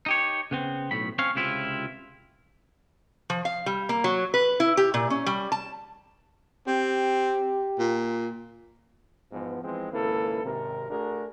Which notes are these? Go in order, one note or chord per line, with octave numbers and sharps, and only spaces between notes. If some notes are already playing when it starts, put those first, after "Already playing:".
D#4 G4 C#5
C#3 B3 C4
B1 A2 B5
C4 C#4 C#5 F5
C#2 C3 E4 F4
F3
F5
G3
A#3
F#3
B4
E4
G4
A#2
C#4
G3
A5
C4 G4
A#2
E2 G#2 F3 B3
E3 F3 G#3 C4
G#1 C#2 A#3 E4 A4 B4
G#1 C3 A#4
A3 D4 F#4 G#4 A#4